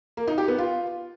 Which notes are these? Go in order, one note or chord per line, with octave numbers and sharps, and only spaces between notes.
A#3
D#4
G4
B3
F4